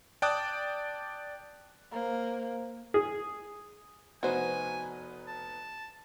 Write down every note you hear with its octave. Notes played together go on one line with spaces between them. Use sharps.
D5 G5 A5 D6 D#6 F#6
A#3 C5 A#5
G#4
F1 B3 D#4 F#4 C5 G#5
A5